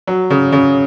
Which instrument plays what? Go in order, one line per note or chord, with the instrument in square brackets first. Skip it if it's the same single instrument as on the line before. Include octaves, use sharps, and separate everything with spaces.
[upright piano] F#3
C#3
C#3